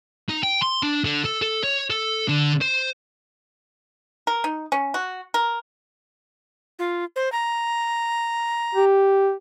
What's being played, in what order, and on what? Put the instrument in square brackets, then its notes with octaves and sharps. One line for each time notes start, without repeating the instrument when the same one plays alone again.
[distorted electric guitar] D#4
G5
C6
D4
D3
A4
A4
C#5
A4
D3
C5
[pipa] A#4
D#4
C#4
F#4
A#4
[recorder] F4
C5
A#5
[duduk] G4